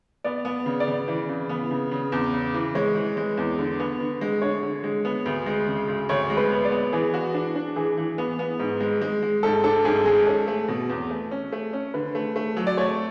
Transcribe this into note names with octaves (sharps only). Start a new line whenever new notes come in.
B3 D5
B3
C#3
D5
C#3
E3
C#3
B3
C#3
C#3
E2
C#3
E3
G#3 C#5
E3
G#3
E2
D3
B3
D3
G#3
D3 C#5
D3
G#3
B3
D2
G#3
C#3
D2
D2 C#5
G#3
B4
B3
D5
B3
E3 G#4
F#4
D4
D4
E3 G#4
E3
B3
B3
G#2
G#3
G#3
G#3
G#2 A4
D4 A4
G#2 G#4
G#3 G#4
C#4 A4
A3
B2
E2
A3
C#4
A3
C#4
D3 B4
A3
A3
F#3
D5
A3 C#5